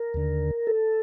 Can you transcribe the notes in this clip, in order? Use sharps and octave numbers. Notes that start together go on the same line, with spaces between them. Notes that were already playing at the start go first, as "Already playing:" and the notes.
Already playing: A#4
D#2 D3
A4